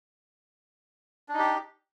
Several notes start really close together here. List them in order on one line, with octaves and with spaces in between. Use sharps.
D4 D#4 G4